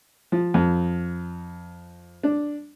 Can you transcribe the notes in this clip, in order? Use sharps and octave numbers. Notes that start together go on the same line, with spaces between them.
F3
F2
D4